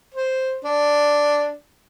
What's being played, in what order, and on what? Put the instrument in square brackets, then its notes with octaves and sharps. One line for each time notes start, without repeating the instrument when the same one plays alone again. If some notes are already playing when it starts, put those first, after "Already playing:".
[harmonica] C5
D4